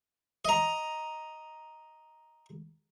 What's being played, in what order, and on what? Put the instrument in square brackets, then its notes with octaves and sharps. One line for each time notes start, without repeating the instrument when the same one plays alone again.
[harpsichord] D#5 A#5